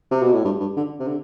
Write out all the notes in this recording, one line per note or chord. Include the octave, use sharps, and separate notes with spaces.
C3
B2
A2
G2
G2
D3
C3
D3